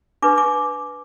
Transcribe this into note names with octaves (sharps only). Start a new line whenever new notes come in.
D4 B4 D6
D6